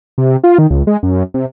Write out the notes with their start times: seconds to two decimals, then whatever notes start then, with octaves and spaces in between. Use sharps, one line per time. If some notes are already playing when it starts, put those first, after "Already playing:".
0.18 C3
0.44 F4
0.58 D#3
0.70 C#2
0.87 G#3
1.03 F#2
1.34 C3